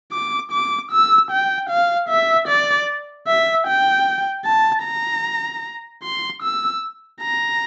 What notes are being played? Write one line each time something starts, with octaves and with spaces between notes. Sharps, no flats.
D6
D6
E6
G5
F5
E5
D5
E5
G5
A5
A#5
C6
E6
A#5